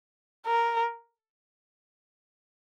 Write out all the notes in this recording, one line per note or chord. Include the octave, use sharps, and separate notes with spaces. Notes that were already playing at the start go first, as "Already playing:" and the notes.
A#4